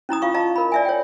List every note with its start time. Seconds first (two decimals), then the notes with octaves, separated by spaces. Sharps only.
0.09 C#4 E4 A#5 D#6
0.22 F4 F5 C#6
0.34 D#5 F5 A5 A#5
0.56 A#4 B5
0.72 D5 E5 G#5
0.85 C#5 G5